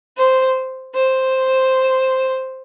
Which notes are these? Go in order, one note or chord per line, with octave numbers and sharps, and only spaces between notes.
C5
C5